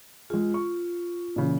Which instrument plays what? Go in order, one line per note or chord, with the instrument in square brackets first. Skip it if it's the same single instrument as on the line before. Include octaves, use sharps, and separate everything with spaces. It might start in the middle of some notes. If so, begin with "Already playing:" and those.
[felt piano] G#3 G#4 [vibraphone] F4
[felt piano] C#6
A#2 C#3 E3